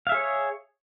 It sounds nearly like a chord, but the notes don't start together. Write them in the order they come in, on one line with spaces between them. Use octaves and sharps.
F5 E5 G#4 C#5